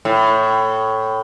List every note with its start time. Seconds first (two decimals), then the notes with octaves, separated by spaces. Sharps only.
0.05 A2